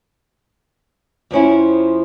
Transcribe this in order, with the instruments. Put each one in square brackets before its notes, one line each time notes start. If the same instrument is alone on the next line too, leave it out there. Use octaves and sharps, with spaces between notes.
[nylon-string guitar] F2 F3 C#4 E4